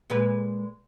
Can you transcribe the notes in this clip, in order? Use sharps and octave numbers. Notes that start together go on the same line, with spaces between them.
A#2 G#3 B4